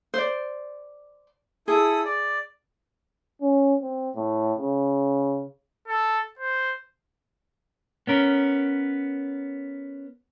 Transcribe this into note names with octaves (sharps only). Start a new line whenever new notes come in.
C5 D5
E4 G#4 A4 D#6
D5
C#4
C4
A2
C#3
A4
C5
B3 C#4 A#4